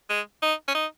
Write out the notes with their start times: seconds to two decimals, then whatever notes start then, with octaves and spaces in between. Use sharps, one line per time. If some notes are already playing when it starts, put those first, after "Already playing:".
0.09 G#3
0.42 D#4
0.68 C#4
0.75 D#4